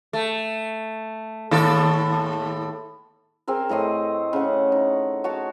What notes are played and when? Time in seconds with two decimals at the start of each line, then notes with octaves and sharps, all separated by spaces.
0.13 A3
1.51 D#2 A2 A4
3.48 C4 G#4 A#4
3.69 A2 A3 D#5 C6
4.33 C#3 F#5
4.72 D#4
5.24 F#4 C#5 A5